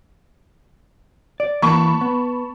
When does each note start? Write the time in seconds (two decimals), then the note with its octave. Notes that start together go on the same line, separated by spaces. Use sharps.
1.40 D5
1.62 E3 A#3 A5 B5 C#6
2.01 B3